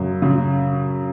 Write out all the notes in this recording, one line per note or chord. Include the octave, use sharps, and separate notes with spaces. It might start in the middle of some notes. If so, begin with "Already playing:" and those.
Already playing: F#2 C#3
C#3